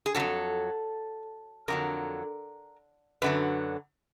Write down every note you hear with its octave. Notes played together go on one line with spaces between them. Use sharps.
G#4
C#3 F#3 A4
F2
F2 D3 F#3 A#4
F#2 D3 F#3 B4